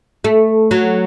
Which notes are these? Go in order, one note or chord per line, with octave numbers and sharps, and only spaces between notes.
A3
F#3